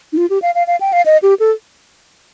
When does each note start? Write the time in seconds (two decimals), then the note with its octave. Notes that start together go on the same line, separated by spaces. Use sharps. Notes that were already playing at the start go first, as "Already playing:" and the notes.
0.13 D#4
0.17 F4
0.30 G4
0.42 F5
0.55 F5
0.67 F5
0.81 G5
0.93 F5
1.06 D#5
1.23 G4
1.40 A4